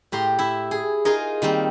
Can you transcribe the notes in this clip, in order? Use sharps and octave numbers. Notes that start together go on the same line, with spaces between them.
A2 G4 A#5 C6
E4 E5
G#4
D#4 F4 G#4 A#4 D#5
D#3 G3 A#3 C4